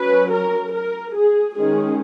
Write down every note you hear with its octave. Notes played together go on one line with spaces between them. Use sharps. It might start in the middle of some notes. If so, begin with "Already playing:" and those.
Already playing: F#3 C#4 B4
A#4
A#4
G#4
D#3 G#3 C#4 G#4